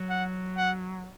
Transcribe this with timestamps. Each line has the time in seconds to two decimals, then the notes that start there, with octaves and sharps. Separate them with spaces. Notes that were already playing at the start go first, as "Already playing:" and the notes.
Already playing: F#3
0.09 F#5
0.57 F#5